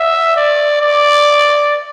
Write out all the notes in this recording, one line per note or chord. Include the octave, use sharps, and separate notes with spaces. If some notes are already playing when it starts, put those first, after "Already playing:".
Already playing: E5
D5
D5